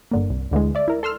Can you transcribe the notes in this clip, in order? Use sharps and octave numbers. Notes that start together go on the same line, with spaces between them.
G1 D3 A#3
C2
D2 D3 E3 G#3
D5 E5
E4 A#4
A4 C6 E6 F6